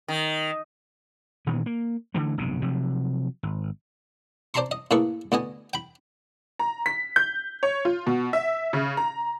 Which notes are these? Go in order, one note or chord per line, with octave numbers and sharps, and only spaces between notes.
D#3
A#2 D#3 E3 B3
A#3
D3 E3 A3
F1 B1 G2 C#3
C3 F3 F#3
G#1
C5 D5 A5 A#5 C6 C#6
D#5
A2 A#3 G#4 A4 B4 C#6
D2 B3 D#5 G#5
G5 B5
A#5
B6
G6
C#5
F4
B2
E5
C#3
A#5